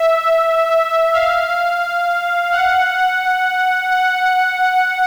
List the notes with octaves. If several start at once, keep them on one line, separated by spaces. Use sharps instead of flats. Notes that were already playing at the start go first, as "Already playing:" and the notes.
Already playing: E5
F5
F#5
F#5